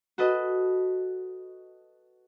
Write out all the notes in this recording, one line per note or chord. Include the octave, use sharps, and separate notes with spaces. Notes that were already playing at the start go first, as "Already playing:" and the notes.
F#4 A4 B4 D#5